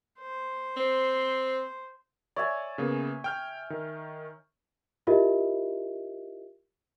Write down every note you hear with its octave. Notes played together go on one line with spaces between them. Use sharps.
C5
C4
C#5 D5 E5 G#5
C#3 A#3 B3
G5 F6 G6
D#3
E4 F4 G4 A#4 D#5 E5